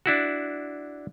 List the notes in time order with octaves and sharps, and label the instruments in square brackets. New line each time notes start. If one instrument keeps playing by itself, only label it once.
[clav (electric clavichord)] D4 E4 F#4